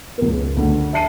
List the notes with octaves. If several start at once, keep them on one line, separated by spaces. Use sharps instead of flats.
C#2 A#4
D2
E5 A5 C7 D#7